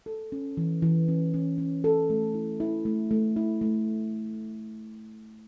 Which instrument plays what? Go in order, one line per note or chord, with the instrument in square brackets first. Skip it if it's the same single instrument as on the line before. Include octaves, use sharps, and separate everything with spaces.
[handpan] A4
C#4
E3
E3
C#4
C#4
C#4
A4
A3
E4
E4
A3
A3
E4
A3